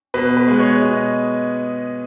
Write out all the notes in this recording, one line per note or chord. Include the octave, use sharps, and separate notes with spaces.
B2 B4
B4
G#3 B3
C#5
B2 D#5